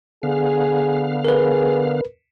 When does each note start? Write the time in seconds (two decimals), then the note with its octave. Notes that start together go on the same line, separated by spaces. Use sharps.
0.23 D3 B3 G#4 F5
1.25 G#4 A#4 B4